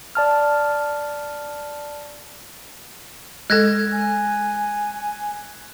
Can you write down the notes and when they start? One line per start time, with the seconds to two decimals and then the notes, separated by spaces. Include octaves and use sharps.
0.15 D5 A5 F6
3.50 G#3 A4 F#6 G#6 A#6
3.92 G#5